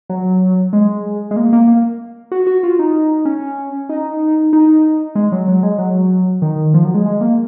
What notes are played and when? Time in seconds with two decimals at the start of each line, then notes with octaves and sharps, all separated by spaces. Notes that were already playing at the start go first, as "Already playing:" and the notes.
0.10 F#3
0.73 G#3
1.31 G#3
1.36 A#3
1.53 A#3
1.68 A#3
2.32 F#4
2.47 F#4
2.63 F4
2.79 D#4
3.25 C#4
3.89 D#4
4.53 D#4
5.15 G#3
5.32 F#3
5.48 F#3
5.63 G#3
5.78 F#3
6.42 D#3
6.74 F3
6.84 F#3
6.94 G#3
7.06 G#3
7.21 A#3